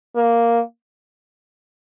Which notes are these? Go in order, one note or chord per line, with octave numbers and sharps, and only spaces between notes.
A#3